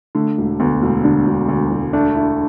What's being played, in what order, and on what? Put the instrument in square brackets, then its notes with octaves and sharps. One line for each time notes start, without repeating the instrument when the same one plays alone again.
[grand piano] D3 [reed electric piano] A3
[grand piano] E1
[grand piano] D2 [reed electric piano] B3
[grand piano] E1
[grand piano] D3 [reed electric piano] D4
[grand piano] E1
D2
E1
[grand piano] A3 [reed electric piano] D4
[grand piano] E4